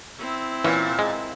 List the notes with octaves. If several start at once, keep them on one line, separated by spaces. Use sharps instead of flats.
C4 E4
A#2 E3 C#4
G#3